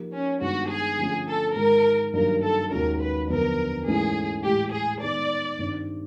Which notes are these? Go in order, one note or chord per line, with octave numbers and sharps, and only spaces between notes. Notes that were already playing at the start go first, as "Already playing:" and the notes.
Already playing: F3 A#3 D#4 G4 A#4
C#4
G2 D#3 G#3 B3 D4 F#4
G#4
D3 F3 A3 C#4 F4
A4
G#2 D#3 G#3 A#4
G2 D#3 F#3 A#3 A#4
A4
D#2 D#3 G#3 C#4 F#4 A#4
B4
F2 D3 F#3 B3 D4 A#4
G#2 E3 A3 C#4 E4 G#4
A2 E3 G#3 G4
G#4
D#3 G#3 B3 D5
G2 D#3 G3 C4